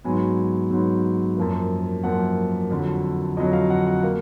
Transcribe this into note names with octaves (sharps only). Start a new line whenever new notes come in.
G#2 F#3 B3 G#5
G#2 F#3 B3
F#2 F3 A#3
F#2 F3 A#3 F#5
F2 D3 F#3
F2 D3 F#3 D#5
F5
F#5
F#5
A#3 F5